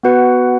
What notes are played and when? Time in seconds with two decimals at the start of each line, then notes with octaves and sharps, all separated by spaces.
0.03 B3 F#4 B4 F#5